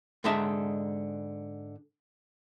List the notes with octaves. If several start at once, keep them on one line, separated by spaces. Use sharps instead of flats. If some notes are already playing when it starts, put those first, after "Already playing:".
G#2 D3 G#3 D#4 E5 A5